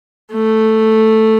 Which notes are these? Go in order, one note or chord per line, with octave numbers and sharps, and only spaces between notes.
A3